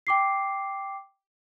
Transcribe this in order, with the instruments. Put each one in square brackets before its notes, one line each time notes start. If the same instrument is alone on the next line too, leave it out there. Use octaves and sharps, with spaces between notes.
[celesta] G5 D6 C7